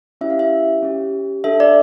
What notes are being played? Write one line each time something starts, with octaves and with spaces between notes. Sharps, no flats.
C#4 E4 G4 E5
F5
E5
C#4 G4
D4 A4 E5
D5